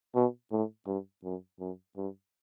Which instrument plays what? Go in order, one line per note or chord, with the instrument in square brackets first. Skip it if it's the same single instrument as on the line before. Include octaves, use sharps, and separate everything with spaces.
[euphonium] B2
A2
G2
F#2
F#2
G2